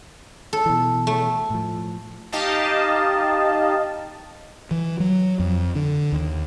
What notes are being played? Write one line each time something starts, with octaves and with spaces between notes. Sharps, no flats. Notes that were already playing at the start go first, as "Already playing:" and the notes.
A4
B2 E3
A3
A2 F3
D#4 G4 D#5 F5 A5
E3
F#3
F2
D3
D#2